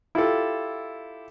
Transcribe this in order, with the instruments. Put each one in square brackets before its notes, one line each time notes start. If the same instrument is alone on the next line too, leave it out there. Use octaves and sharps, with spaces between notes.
[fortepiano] E4 F4 G4 A4